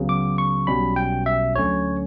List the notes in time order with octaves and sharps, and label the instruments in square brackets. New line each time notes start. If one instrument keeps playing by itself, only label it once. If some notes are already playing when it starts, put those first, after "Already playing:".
Already playing: [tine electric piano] C#2 C#3 F#3 B3
D6
C#6
B1 B2 G3 C#4 B5
G5
E5
D2 D3 F#3 C#4 C#5